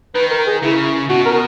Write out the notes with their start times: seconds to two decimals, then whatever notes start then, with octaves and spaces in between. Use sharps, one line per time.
0.15 D#3 B4
0.31 A#4
0.47 G#4
0.62 C#3 E4
1.09 B2 F#4
1.26 A#4